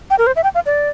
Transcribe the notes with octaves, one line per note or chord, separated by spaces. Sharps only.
G5
A#4
C5
E5
G5
F5
D5